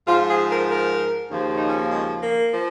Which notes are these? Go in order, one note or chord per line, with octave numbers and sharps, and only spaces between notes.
G#2 F3 F4
G#4
A#4
A#4
D#2 C#3 F3
D#4
C#4
A#3
G#3
A#3
F3